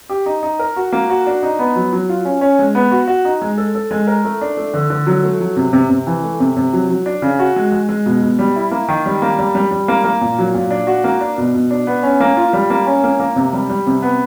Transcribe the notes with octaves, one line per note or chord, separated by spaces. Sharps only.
G4
D#4
D#4
A#4
F#4
A#3
F#4
D4
D#4
B3
F#3
F#3
F4
C#4
C#4
G#3
B3
F#4
F#4
D#4
G#3
A4
A4
G#3
A#4
A3
D4
A3
D3
D3
F#3
A3
F#3
C3
C3
C3
E3
A3
C3
C3
F#3
F#3
D4
C#3
F#4
G#3
G#3
G#3
B2
B2
G3
E4
A#3
D#3
G3
A#3
G3
G3
G3
A#3
A#3
A#2
F#3
A#2
D4
F#4
A#3
D4
B2
B2
D4
B3
C#4
A#3
F4
G3
A#3
C#4
A#3
A#3
C3
G3
G3
C3
B3